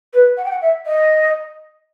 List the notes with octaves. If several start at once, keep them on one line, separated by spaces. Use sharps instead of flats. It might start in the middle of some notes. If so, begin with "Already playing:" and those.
B4
F#5
G5
F#5
E5
D#5